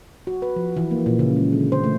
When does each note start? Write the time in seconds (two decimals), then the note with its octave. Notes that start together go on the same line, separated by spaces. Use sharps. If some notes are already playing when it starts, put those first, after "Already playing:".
0.27 F#4
0.42 B4
0.56 F3
0.77 E3
0.91 A#3
1.06 A#2
1.19 C#3
1.36 G#3
1.53 D3
1.72 C5
1.84 A3